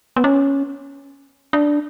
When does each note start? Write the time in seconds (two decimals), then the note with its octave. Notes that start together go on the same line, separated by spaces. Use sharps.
0.16 B3
0.24 C#4
1.53 D4